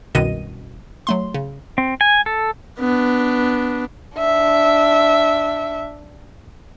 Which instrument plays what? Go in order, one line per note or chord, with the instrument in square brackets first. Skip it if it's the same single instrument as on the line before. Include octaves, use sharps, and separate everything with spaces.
[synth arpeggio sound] C2 F#2 B2 D#3 D#5 D#7
F#3 A3 C6
C#3
[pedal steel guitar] C4
G#5
A4
[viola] B3 D4
[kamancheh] D4 E5